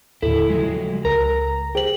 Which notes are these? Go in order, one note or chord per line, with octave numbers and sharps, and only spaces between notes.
D#2 A2 D3 E4 A4
C#3 F3 F#3 G#3
C#2 A#4 A#5
G4 G#4 C5 F#7